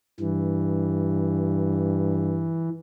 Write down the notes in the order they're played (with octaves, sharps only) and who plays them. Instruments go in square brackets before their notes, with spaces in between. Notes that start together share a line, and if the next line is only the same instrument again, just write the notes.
[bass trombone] G2 [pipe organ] E3